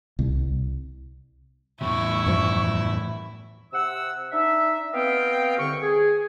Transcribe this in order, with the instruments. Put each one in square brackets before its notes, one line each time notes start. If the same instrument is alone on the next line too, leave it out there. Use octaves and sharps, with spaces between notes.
[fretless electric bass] C2
[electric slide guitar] E2 A2 C3 [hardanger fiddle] E4 [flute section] C#6
[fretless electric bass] F#2 F3 G3
[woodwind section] C3 F#5 E6
D4 D#4 E5
B3 C4 D#5 F5 G5
C2 D3 C#6
G#4